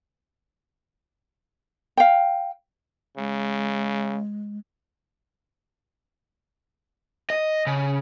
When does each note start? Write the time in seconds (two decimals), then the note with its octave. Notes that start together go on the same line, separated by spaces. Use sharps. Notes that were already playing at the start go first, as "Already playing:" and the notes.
1.97 F5 G5
3.17 C#3 G#3
7.30 D#5
7.67 C#3